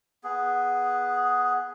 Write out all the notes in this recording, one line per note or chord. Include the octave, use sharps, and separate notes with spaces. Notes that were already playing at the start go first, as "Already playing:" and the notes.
B3 G#4